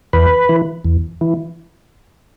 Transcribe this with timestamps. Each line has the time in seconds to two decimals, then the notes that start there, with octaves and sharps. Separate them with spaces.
0.13 E2 B4
0.49 E3
0.85 E2
1.21 E3